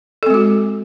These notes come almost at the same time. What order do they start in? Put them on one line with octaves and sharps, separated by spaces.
A4 C4 G#3 F#4